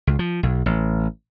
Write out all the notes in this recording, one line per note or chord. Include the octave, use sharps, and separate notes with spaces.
C#2
F3
B1
A1